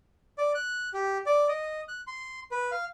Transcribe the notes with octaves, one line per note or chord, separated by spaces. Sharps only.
D5
F#6
G4
D5
D#5
F#6
C6
B4
F5